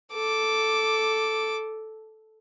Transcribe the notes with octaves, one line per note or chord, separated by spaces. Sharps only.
A4 D6